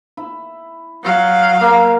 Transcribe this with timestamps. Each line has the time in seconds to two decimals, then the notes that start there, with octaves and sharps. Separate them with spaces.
0.17 E4
1.03 F#3 F5
1.61 A#3